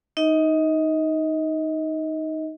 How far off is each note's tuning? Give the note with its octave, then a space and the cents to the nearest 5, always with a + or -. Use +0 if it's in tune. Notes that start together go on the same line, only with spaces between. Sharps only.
D#4 +0 D#5 +30